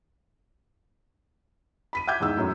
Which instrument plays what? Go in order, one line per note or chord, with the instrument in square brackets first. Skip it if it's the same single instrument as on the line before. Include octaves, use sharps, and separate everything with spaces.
[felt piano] B5 B6 D#7
E5 F#5 G5 D6 G6 G#6
E2 G#2 E6
F#2 A2